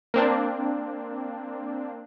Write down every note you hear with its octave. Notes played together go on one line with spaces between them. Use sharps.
A#3 C4 D4